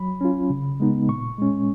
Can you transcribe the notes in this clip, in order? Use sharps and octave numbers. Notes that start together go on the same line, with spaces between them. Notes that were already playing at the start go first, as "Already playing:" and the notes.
Already playing: F#3 B5
C#4 F4
C#3
G#3 B3 D#4
A#2 C#6
G#3 C#4